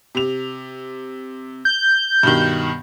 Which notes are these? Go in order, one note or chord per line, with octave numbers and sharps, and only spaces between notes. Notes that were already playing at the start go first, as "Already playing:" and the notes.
C3 F7
G6
G2 B2 D#3